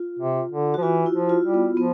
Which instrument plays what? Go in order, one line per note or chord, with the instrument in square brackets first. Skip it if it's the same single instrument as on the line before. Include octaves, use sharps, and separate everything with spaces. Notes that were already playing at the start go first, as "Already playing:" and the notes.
Already playing: [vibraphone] F4
[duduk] C3
D3
[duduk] F3 [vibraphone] F#4
[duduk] E3 [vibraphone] F4
[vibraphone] E4
[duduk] F3
[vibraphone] F4
[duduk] G3
[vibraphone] B3
[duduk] F3 [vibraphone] B3